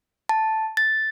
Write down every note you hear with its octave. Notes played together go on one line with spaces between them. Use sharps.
A5
A6